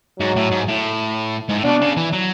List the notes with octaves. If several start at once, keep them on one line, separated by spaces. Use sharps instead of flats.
G#2 F#3
A2
G#2
A2
G#2
A2
B2 D4
C#3
E3
F#3